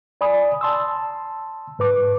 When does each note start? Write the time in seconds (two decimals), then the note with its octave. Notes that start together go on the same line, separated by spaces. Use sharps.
0.21 D5 G#5 B5 D#6
0.61 A5 C6 E6
1.79 G#2 B4 D6